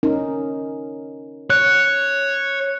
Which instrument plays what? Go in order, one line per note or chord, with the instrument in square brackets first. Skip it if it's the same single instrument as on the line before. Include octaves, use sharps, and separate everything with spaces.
[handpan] C#4 D#4 A#4
[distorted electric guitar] C#5 [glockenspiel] F#6